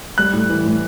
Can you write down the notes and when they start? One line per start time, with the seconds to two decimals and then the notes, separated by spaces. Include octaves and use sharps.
0.18 G3 F#6
0.33 A2
0.50 E3
0.65 A2